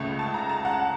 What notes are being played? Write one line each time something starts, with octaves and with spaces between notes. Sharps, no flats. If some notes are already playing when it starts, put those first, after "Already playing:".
Already playing: C#2 C#3 A3
A5
A#5
A5
F#5